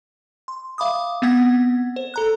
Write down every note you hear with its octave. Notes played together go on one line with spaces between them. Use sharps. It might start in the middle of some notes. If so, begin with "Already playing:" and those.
C6
E5 F5 B5 D6 D#6
B3 C4 F#5 G#6 B6
C5
A4 A#5 F#6